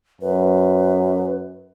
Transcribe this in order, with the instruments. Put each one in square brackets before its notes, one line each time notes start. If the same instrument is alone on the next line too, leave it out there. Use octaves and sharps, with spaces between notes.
[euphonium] F#2 [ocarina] B4